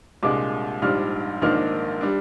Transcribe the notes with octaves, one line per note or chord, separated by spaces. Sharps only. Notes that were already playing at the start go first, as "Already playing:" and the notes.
C2 A#2 G#3 D4 D6
A#1 G#2 G3 D4 F6
A#1 G#2 D#3 A#3 D4 F6
G3 D4